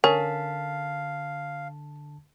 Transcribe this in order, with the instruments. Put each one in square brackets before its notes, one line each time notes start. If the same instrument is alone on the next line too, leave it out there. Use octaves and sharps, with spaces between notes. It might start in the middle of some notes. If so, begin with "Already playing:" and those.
[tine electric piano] D3 A5 B6 [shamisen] C#4 [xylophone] A#4 [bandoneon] F5